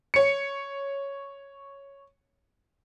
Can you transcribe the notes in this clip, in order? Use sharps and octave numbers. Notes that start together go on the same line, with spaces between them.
C#5 C#7